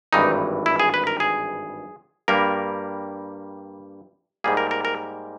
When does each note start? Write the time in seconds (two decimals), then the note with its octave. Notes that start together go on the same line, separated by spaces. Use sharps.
0.13 G#1 G2 E3 D#4
0.66 E4
0.80 G#4
0.94 B4
1.07 A#4
1.20 G#4
2.28 G2 G3 A#3 A#4
4.44 G#2 G3 A#3 G#4
4.57 A#4
4.71 A#4
4.85 A#4